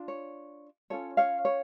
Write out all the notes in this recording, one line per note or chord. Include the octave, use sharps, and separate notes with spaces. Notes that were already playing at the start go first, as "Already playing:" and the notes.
Already playing: D4 F4
C#5
C#4 F4 A4 C#5
C#5 F5
C#5